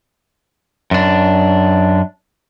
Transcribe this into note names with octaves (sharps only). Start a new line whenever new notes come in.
F#2 D4